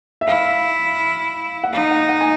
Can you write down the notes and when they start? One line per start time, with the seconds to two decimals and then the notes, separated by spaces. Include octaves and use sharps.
0.21 E5
0.27 E4 F5
1.64 F#5
1.73 D#4 F5
1.91 F#5
2.09 F#5
2.21 G#5